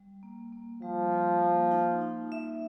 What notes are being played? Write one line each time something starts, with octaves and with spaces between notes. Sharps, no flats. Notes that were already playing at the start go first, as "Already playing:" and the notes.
Already playing: G3
A#3
A#3
F3 G3
G3
A#3
D#4
D#4
E5